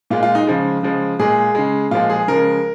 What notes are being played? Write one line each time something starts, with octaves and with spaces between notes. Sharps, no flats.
A#2 G#3 F4
F4
D#4
C#3 F3 G#3
C#3 F3 G#3
A#2 G#3 G#4
C#3 G#3
A#2 F3 G#3 F4
G#4
C#3 F3 G#3 A#4